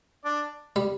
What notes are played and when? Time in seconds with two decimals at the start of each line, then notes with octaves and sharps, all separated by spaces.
0.25 D4 D5
0.76 G3